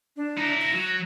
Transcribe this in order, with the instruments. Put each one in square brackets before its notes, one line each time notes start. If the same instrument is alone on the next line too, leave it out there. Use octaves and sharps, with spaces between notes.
[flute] D4
[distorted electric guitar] D#4 E4
[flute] A#6
[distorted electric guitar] F#3